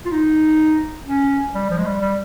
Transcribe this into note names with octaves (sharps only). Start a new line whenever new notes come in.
F4
D#4
C#4
G3
F3
G#3
G3
G3